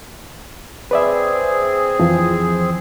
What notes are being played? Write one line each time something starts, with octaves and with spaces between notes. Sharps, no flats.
C4 G#4 B4 D5 E5
F2 E3 F3